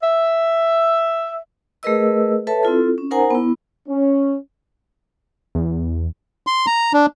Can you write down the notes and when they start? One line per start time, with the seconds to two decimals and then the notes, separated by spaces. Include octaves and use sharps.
0.01 E5
1.83 A3 G#4 A#4 B4 D#5 E6
2.47 A4 B4 C#5 E5 A5
2.63 C4 E4 F4 A4
2.98 C#4
3.11 D#4 A#4 C5 F#5 G#5 A#5
3.30 B3 E4
3.88 C#4
5.55 E2
6.47 C6
6.67 A#5
6.93 D4